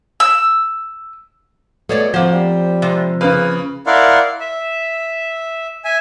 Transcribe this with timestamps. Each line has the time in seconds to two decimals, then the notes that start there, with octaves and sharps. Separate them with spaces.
0.20 E6
1.89 B2 A3 G#4 C#5 D5
2.14 F3 A#3 C4 F#4 C5
2.33 G3
2.82 C3 G#3
3.21 C#3 A#3 G#4 B4
3.87 E4 A#4 D5 F5 F#5 C6
4.40 E5
5.84 E5 G#5